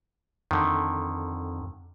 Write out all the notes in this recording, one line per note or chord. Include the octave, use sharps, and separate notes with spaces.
F2 D3 D#3